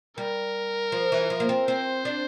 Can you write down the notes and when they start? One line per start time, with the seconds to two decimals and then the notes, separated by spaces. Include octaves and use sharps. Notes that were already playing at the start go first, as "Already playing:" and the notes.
0.18 G3 A#4
0.92 F3
1.12 E3
1.30 F3
1.40 A#3
1.49 C4
1.68 C4 C5
2.05 D4